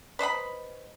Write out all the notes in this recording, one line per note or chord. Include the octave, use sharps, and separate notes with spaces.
B4 C5 D#5 B5